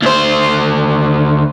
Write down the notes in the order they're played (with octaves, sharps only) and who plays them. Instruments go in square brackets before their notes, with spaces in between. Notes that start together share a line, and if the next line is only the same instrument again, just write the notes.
[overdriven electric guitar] D2 C5